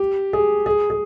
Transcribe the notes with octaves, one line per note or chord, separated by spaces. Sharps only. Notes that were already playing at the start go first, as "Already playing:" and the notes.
Already playing: G4
G#4
G#4
G#4